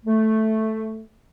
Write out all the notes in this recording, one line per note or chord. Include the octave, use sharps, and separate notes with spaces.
A3